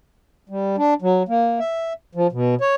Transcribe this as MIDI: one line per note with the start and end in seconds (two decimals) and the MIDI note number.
0.49 0.76 55
0.78 0.94 62
1.02 1.23 54
1.28 1.59 58
1.59 1.93 76
2.15 2.27 53
2.32 2.55 47
2.61 2.75 73